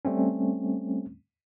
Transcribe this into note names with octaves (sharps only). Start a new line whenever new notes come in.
G3 A3 C4 C#4